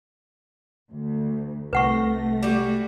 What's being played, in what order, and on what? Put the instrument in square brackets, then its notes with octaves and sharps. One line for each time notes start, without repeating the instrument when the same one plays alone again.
[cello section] D2
[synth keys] C2 C3 A#6 [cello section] A3 [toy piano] B4 F#5 C#6
[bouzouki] G3 F#4